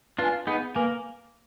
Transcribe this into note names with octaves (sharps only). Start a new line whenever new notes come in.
D4 F4 B4 F5 G#5
B3 D#4 G#4
A#3 B4 F5 G#5